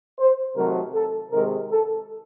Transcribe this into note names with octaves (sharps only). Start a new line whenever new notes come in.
C5
C3 D#3 F#3 A3 A#4
A4
C3 D#3 G#3 A#4
A4